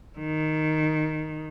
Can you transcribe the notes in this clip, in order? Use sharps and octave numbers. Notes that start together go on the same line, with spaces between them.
D#3